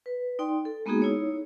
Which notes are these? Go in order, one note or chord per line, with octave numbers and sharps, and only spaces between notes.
B4
D#4 D5 G5 C6
A4
G#3 A#3 B3 D#4 F#4 G#4
D#4 E4 C#5